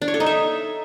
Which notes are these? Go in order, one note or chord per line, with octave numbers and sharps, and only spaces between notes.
D4
C#5
A4
D#4
E5